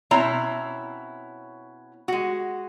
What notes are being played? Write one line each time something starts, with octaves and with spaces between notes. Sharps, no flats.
B2 C4 C#4 E4 C#5 A#5
G#3 F#4